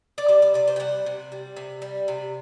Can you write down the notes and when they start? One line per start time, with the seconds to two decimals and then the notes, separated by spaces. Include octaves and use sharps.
0.18 D5
0.28 G3 C5
0.42 D5
0.54 C3 D5
0.68 C5
0.76 G5
0.80 G3 F#5
1.06 C3
1.32 G3
1.56 C3
1.82 G3
2.08 C3